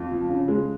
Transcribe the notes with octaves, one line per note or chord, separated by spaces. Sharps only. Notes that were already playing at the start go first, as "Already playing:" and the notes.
Already playing: F2
F3
C#3
G#3